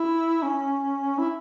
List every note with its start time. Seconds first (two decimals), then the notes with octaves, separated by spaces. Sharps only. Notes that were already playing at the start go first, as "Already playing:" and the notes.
Already playing: E4
0.43 C#4
1.18 E4